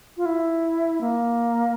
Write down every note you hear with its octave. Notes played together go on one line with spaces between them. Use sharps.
F4
E4
A#3